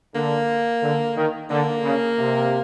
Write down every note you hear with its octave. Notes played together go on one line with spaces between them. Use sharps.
D3 A#3
D3
D#3
D3 A#3
C#3
C3